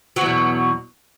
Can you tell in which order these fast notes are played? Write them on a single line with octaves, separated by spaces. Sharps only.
F#3 E2 B2